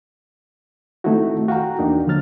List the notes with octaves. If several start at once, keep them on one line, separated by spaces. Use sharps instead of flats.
D#3 A3 C4 D#4 E4 F#4
F#4 F5 G5 A#5
E2 A#3 D4 D#4
D3 F3 F#3 F6 A6